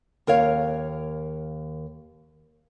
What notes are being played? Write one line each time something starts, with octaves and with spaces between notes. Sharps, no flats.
D#2 A#4 C#5 F5